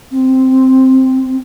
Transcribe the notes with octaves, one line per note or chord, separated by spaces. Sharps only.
C4